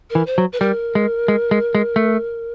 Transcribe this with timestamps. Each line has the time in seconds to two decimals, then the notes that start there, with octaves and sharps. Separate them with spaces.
0.10 A#4
0.15 E3
0.26 C5
0.38 F#3
0.53 B4
0.60 G3 A#4
0.95 G#3
1.28 G#3
1.51 G#3
1.75 G#3
1.96 A3